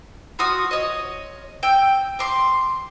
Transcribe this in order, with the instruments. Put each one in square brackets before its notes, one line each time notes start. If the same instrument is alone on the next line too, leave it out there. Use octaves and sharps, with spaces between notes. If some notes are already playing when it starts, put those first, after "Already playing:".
[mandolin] F4 F#4 D#6
C#5 D#5
G5 E6
C6 D6